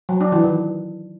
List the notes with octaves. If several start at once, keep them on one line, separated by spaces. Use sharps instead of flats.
F#3
D4
E3
D#3